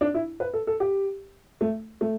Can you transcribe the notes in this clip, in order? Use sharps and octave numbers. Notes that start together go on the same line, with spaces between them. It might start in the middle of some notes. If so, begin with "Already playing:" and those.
D4
E4
B4
A4
A4
G4
A3
A3